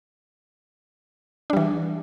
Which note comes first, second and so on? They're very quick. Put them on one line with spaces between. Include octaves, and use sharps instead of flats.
D4 G3 E3